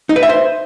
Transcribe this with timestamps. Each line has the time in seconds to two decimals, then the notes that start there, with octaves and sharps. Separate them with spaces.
0.09 D#4
0.16 B4
0.23 E5
0.29 C5